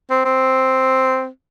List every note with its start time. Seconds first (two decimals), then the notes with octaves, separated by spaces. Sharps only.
0.10 C4
0.25 C4